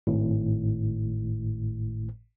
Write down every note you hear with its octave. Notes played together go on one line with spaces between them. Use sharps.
G#1 A2